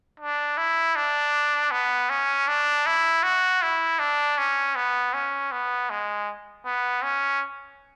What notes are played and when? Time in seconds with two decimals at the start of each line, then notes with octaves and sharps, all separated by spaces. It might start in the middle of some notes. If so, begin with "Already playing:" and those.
0.20 D4
0.58 E4
0.96 D4
1.71 B3
2.10 C#4
2.48 D4
2.86 E4
3.23 F#4
3.62 E4
3.99 D4
4.38 C#4
4.76 B3
5.14 C#4
5.52 B3
5.90 G#3
6.65 B3
7.03 C#4